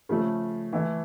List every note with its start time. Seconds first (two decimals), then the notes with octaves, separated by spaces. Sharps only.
0.09 C#3 F3 A3
0.73 E3 A3 E4